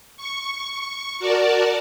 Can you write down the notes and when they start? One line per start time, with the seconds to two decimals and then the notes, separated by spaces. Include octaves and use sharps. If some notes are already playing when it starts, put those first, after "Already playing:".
0.17 C#6
1.19 F#4 A#4 D5 A5